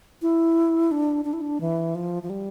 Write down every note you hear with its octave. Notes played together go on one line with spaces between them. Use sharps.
E4
D4
D4
E4
D4
E3
F3
F3
G3